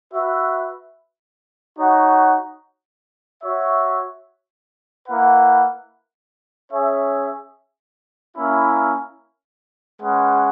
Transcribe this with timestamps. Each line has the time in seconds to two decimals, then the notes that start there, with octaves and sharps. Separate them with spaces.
0.13 F#4 B4 E5
1.78 D#4 F#4 C#5 F#5
3.43 F#4 C#5 E5
5.07 A#3 E4 B4 F#5
6.72 C#4 G#4 C#5 E5
8.37 A#3 C#4 E4
10.01 G#3 C#4 G#4 B4 F#5